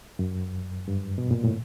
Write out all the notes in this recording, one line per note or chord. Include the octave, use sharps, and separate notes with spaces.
F#2
G2
B2
A#2
A2